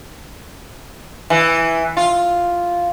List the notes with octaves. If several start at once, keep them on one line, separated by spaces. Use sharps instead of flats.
E3
F4